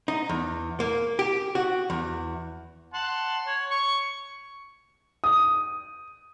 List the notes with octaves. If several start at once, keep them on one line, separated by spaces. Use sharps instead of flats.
D#4
E2
A#3
G4
F#4
E2
F#5 A5 C6
C#5
C#6
D#6